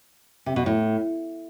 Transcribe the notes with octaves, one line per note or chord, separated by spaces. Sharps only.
C3
B2
A2